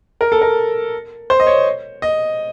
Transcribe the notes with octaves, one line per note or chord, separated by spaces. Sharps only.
A#4
A4
A#4
C5
D#5
C#5
D#5